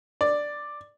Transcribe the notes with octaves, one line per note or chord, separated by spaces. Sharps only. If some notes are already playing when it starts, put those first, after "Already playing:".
D5